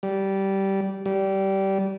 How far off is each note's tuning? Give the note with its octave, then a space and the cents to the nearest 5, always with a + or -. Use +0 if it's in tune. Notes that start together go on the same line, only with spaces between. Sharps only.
G3 -15
G3 -20